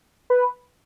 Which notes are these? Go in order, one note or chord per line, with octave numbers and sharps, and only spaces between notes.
B4